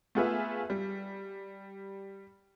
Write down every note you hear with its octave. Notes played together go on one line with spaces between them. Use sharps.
A3 B3 F4 G#4 B4 E5
G3